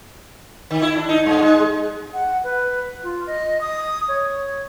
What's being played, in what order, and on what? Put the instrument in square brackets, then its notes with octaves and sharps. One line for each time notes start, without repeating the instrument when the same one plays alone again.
[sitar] D#3
E4
D4
D#4
G2
G#3
[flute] F#5
B4
F4
D#5
D#6
C#5